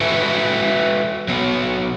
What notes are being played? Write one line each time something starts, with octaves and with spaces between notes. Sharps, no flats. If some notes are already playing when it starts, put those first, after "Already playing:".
F#4 A4 B4 E5 G5 G#5
F#3 B3